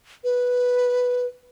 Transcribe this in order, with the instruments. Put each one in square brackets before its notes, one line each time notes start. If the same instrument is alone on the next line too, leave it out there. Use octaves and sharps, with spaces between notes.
[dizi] B4